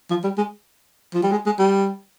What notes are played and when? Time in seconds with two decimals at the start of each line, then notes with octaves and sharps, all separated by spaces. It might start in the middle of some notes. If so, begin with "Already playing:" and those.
0.10 F3
0.24 G3
0.38 G#3
1.14 F3
1.23 G3
1.31 G#3
1.46 G#3
1.59 G3